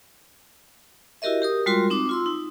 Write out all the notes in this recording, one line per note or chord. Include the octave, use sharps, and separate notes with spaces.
E4 F#4 G4 A#4 D#5 E5
G4 A#4 D#6
G3 G#3 F4 F#4 A#4 C6
C4 D#4 D6
F4 C6 E6
D#4